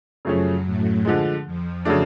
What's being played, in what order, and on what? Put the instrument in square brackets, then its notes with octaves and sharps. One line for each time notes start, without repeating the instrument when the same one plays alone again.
[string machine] F#2 F#3 [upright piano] C#3 F3 A3 C#4 G#4
[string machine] A2 A3
[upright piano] D3 F3 G#3
[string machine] F2 F3
[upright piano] C#3 F#3 A3 D4